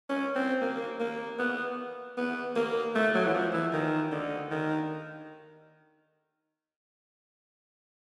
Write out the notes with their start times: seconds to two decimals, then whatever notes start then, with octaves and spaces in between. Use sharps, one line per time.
0.09 C#4
0.35 C4
0.61 A#3
1.00 A#3
1.39 B3
2.17 B3
2.56 A#3
2.95 A3
3.15 F#3
3.27 E3
3.34 F3
3.53 E3
3.73 D#3
4.12 D3
4.51 D#3